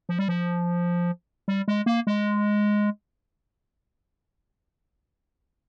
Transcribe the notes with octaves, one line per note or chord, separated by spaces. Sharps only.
F3
G3
F3
G3
G#3
A#3
G#3